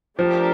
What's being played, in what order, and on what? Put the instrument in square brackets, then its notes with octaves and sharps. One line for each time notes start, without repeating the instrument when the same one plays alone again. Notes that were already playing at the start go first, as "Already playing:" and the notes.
[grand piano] F3 [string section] A3 D4 G4 A#4